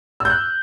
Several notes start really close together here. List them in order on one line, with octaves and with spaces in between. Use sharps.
E6 G6 F#6